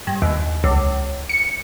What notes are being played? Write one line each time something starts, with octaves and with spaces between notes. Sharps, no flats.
G2
D#2
C#2
C#7